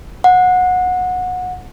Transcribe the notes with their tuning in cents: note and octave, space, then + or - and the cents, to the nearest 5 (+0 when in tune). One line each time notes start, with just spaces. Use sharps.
F#5 -20